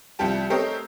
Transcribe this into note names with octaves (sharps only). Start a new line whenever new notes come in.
C2 F3 G3 G4 A5
A3 C4 G4 A#4 C#5 D#5